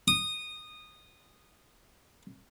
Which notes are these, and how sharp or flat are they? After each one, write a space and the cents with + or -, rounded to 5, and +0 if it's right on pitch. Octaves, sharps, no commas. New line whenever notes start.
D#6 -15